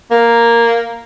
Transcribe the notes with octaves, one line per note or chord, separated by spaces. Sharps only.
A#3